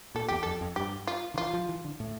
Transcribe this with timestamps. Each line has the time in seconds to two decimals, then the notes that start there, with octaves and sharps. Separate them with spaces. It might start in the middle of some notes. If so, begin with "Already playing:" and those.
0.15 A#2 A4
0.28 E2 G4
0.43 F2 A4
0.61 F2
0.76 G2 G4
1.07 F4
1.34 D3
1.38 E3 F4
1.53 F3
1.69 E3
1.84 D3
2.00 A2